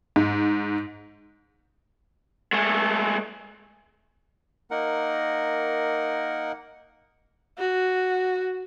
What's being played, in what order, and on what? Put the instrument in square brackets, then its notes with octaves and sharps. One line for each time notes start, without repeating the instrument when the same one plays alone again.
[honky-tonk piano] G#2
[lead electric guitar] G#3 A3
[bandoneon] A#3 D#4 A#4 F#5
[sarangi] F#4